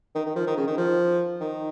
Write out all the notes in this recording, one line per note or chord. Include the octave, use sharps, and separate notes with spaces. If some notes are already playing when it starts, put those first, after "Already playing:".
D#3
D#3
F3
D#3
C#3
D#3
F3
D#3